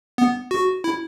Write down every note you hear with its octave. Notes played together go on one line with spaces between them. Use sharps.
B3
F#4
E4